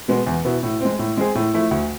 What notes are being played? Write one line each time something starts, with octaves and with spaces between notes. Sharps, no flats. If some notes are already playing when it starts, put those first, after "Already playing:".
B2 G#3 B3
E2
B2 B3 E4
A2
G#3 C4
A2
G#3 C4 G#4
A2
F3 A3 E4
D2